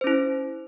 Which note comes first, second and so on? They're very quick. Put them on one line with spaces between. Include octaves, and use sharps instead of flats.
C5 C#4 E4